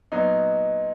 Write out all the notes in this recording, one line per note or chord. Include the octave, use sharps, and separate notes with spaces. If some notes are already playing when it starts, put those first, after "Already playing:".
A#2 F#3 B3 D#4